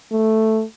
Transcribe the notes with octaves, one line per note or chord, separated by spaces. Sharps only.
A3